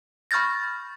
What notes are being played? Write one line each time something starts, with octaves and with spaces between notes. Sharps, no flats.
B5 C#6 F6 G6 A6 A#6